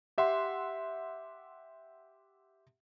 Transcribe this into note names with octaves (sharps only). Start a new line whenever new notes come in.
G4 E5 F#5 C6